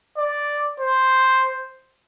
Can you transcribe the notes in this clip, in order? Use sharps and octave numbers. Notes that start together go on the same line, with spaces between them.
D5
C5